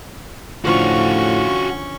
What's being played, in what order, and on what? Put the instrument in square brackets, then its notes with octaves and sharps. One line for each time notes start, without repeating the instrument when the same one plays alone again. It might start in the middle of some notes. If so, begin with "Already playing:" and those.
[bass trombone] A2 [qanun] D3 F3 D4 [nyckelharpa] C#4 C#6 [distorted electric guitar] F#4 F5